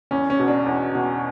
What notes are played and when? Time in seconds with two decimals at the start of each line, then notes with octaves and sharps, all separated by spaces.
0.11 E2 C#4
0.30 C#4
0.40 B2
0.48 D4
0.66 E2
0.95 B2